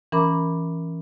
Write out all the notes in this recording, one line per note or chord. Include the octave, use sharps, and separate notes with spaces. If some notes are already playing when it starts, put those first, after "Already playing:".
E3 C#4 A#4 A#5 B5 D6